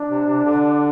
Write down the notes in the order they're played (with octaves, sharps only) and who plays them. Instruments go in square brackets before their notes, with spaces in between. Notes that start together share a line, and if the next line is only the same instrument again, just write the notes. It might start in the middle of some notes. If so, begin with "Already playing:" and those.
Already playing: [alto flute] D4
[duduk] C3
C3
D3